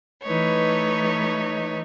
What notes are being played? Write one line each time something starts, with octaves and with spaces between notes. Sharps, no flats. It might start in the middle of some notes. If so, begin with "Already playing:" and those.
E3 A3 D#4 B4 C#5